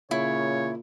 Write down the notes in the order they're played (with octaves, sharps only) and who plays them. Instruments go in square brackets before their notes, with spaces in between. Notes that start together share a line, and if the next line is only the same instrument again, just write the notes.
[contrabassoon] A#2 [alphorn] C#3 [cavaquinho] E4 [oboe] C#5